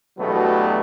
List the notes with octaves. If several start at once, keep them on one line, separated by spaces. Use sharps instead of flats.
E2 G2 B2 F#3 A3 B3